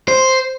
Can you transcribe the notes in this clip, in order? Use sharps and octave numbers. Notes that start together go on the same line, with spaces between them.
C5